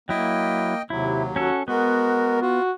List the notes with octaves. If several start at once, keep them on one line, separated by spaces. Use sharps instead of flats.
F#3 A#3 E4 D#5 G5
D#2 C3 F#3 E4
C#4 F#4 A4
G#3 B3 F#4 A#4
F4 F#4